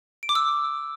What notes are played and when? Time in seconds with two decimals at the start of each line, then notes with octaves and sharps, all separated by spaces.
0.23 D7
0.29 D6
0.35 E6